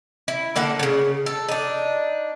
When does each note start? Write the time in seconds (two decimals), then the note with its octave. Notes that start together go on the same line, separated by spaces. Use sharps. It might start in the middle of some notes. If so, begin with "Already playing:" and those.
0.28 E4
0.56 D3 A#3 A4 F#5
0.79 A#2 C#3
1.26 A4
1.49 D4 D#4